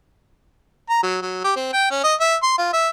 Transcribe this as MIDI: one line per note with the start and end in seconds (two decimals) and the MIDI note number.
0.90 1.03 82
1.03 1.17 54
1.22 1.42 54
1.44 1.52 67
1.56 1.73 60
1.73 1.87 79
1.91 2.00 61
2.04 2.14 75
2.20 2.36 76
2.43 2.56 84
2.58 2.73 65
2.73 2.89 76